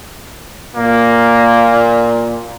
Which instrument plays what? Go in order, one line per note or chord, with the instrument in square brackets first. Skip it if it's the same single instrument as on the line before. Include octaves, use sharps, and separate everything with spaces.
[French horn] A#2 [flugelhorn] A#3